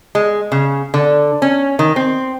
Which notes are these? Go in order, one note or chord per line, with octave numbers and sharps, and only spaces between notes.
G#3
C#3
D3
C#4
D#3
C4